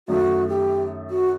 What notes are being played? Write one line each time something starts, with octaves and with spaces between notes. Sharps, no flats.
F#2 D#3 A3 F#4
G4
F#4